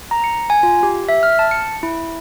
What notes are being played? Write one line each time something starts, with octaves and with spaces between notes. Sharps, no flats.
A#5
C#7
G#5
F4
G4
E5
F6
A5
C#7
E4